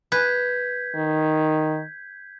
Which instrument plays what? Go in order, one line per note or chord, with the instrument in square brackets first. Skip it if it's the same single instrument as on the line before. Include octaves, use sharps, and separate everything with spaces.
[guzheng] B4 [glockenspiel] G6 G#6 B6
[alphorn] D#3